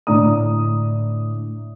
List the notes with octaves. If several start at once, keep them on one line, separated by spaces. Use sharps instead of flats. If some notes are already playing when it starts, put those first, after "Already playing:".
A2 D3 D5 A#5 D#6